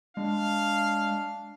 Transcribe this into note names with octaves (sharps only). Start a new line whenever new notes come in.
G#3 D4 F5